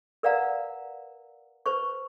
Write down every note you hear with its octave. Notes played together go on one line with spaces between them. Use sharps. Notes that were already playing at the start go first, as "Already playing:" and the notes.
A#4 B4 D5 F5 F#5 A#5
B4 C5 C#6